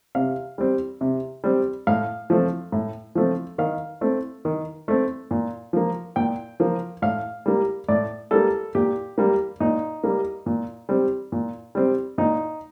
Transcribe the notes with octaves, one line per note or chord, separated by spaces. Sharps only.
C3 F5
G3 C4
C3
G3 C4
A2 F5
F3 A3 C4
A2
F3 A3 C4
D#3 F5
A3 C4
D#3
A3 C4
A#2
F3 A#3
A#2 G5
F3 A#3
A2 F5
G3 A#3
A2 D5
G3 A#3 A4
A#2 G4
G3 A#3
A#2 D#4
G3 A#3
A#2
G3 C4
A#2
G3 C4
A#2 D#4